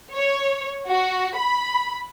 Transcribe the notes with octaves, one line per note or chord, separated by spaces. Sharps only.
C#5
F#4
B5